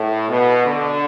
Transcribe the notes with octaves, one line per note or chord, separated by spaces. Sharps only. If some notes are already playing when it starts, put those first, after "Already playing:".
Already playing: A2
B2
D3